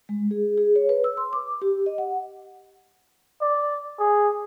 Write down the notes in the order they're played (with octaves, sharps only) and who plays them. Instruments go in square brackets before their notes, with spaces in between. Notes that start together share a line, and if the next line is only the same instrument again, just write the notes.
[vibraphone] G#3
G#4
G#4
C#5
B4
E6
C6
D6
G4
D#5
F#5
[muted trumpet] D5
G#4